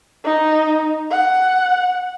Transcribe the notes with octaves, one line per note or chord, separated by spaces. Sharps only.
D#4
F#5